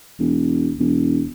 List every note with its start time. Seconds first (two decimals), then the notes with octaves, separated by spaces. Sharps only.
0.19 E1
0.79 E1